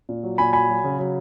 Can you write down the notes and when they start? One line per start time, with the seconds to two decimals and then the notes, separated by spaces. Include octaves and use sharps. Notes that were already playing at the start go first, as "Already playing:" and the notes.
0.09 A#2
0.23 F#3
0.38 A#2 G#5 B5
0.53 F#3 G#5 B5
0.69 F#3
0.84 C#3
0.99 F#3